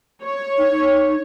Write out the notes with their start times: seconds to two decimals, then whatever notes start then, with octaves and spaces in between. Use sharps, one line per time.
0.22 C#5
0.58 D#4